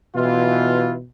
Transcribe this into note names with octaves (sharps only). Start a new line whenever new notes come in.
B2 E3 F4